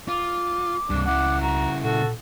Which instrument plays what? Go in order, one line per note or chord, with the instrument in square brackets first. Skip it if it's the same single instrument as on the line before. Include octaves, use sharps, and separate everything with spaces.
[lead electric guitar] F4 [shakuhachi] D6
[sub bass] C#2 [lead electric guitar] G2 C3 [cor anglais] D4
[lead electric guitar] C#3 E4 [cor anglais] F#5 [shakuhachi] D6
[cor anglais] F#4 [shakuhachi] A#5
[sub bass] A#2 [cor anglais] F#4 [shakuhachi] A4